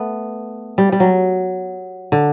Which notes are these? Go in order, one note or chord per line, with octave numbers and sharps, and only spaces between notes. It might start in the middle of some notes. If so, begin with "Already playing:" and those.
Already playing: A3 B3
G3
G3
F#3
D3